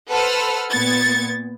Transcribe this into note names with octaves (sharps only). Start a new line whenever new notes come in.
A4 B4 C5 F#5 E6 F6
A#2 B3 G#6 A6 C#7